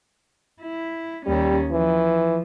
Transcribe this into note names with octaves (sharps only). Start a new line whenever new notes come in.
E4
D#2 G3 C#4
E3 F3